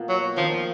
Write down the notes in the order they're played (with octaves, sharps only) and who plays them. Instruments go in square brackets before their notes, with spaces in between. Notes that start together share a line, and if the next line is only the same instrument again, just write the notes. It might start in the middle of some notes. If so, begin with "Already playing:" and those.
Already playing: [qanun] B2 A#3 F4
[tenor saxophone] F#3
[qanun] D#3 A#3 D#4 [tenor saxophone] F3
[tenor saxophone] F3